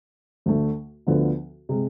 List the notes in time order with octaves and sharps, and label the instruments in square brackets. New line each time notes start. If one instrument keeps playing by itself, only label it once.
[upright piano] D2 D3 A3
D2 D3 F3 B3
C3 G#3